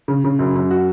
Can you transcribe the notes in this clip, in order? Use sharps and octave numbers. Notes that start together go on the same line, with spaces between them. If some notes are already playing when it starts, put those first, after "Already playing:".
C#3
C#3
F#2
F#2
F#4